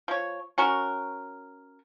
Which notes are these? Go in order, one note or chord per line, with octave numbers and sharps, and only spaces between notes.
F3 C#5
C#4 F#4 A#4